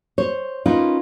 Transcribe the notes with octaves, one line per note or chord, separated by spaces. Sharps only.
C5 C#5
C#4 D#4 F4 A#4 B4